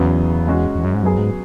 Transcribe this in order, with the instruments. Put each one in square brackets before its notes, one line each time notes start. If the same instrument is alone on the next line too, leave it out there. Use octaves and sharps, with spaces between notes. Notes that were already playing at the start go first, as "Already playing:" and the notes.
Already playing: [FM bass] E2 [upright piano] C#3 F#3 B3
[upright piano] G#3 C#4 F#4
[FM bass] E2
F#2
G#2
[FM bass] F#2 [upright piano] F#3 B3 G#4
[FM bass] G#2